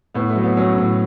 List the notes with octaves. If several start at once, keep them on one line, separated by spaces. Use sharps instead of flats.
A2 B3
A3
F#3
B3
F#3 C#4
A2